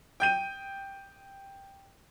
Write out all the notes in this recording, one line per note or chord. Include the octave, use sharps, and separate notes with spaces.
G5 G6 D#7